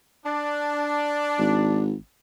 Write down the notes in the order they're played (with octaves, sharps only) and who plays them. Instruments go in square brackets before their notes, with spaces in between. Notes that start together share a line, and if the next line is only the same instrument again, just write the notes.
[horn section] D4
[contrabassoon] G#1